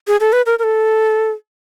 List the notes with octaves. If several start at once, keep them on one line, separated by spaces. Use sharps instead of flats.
G#4
A4
B4
A#4
A#4
A4